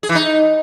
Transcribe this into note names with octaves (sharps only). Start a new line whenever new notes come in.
G#4
E3
D#4